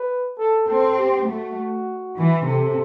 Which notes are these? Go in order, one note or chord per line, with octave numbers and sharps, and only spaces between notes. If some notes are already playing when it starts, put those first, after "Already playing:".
Already playing: B4
A4
C4 A4
G4
A3 F#4
E3
C3 A4